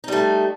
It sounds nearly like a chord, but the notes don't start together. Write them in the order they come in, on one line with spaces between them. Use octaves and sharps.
D#4 G3 A3